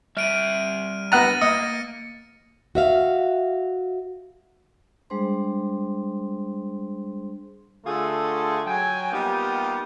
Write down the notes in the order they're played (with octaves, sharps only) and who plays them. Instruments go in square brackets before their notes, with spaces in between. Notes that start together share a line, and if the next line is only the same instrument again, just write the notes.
[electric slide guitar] G3 E5 [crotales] F6 D7 D#7
[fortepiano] B3 F#5 A#5 [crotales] A6 A#6 D#7
[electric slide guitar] A#3 [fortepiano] D#5 [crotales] C#7
[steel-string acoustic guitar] F#4 E5 F5
[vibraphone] G3 G#3 D4 G#4 C5 C6
[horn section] D3 A3 F4 G#4 A4 C6
F#3 G5 G#5
G3 A#3 B3 D#4 F4 G4